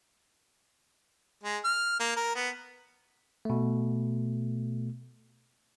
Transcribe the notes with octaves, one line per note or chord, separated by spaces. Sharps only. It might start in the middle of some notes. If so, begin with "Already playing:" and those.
G#3
F6
A#3
A#4
B3
B2 A3